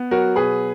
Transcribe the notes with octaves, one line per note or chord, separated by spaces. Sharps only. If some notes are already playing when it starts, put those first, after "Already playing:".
Already playing: B3
F#3 F#4 A#4
B2 G#4 B4